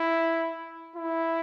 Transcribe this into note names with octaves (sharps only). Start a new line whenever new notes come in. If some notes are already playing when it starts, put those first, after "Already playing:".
Already playing: E4
E4